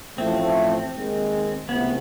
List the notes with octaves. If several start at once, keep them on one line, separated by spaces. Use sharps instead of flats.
A1 A2 F3 A3 C4
D#2 D#3 G#3
C#2 C3 E3 A3 B3 C4